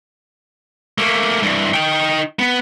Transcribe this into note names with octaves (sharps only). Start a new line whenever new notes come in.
A3 A#3
G2 E3
D#4 G5
B3